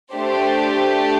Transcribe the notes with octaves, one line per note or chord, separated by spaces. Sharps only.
A3 D4 G4 C5